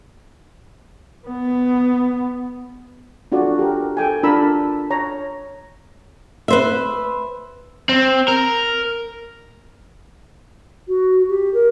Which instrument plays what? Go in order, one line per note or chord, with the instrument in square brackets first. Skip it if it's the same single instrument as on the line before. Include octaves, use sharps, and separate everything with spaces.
[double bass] B3
[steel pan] D4 F4 F#4 A4 D5
G4 A#4
A4 G5 G#5
D4 F4 A#4 A5 B5 E6
C#5 A#5
[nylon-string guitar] B4 C5 E5
[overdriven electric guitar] C4
A#4
[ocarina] F#4
G4
A#4